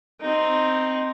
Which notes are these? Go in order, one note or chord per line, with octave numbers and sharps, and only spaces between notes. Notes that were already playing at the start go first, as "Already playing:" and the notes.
C4 D#4